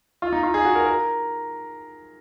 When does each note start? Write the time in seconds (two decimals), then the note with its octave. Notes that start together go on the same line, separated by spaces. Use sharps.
0.22 F4
0.33 D#4
0.43 F4
0.54 G#4
0.65 F#4
0.75 A#4
0.86 A#4